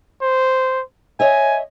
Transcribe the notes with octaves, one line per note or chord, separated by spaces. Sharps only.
C5
C#5 D#5 E5 G#5